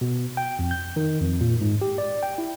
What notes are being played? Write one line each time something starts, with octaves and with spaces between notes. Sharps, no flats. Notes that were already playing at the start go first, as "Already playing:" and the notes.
B2
G5
F2
G6
D#3
F2
A#2
G#2
G4
D5
G5
E4